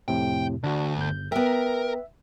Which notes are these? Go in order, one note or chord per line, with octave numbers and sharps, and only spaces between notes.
F2 A2 C3 G5
D2 D4 F#4
G1 G6
B3 A#4 E5 G5